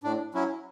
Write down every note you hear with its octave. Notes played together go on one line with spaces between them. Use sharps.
A2 D4
F#3 C#4 E4